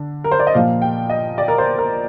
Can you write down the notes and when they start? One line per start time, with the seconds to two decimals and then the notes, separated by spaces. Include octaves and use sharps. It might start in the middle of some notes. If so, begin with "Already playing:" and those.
Already playing: D3
0.24 A#4
0.31 C5
0.39 D5
0.47 D#5
0.54 A#2 F3 A#3 F5
0.82 G5
1.10 D#5
1.38 D5
1.48 A#4
1.58 C5
1.78 A#4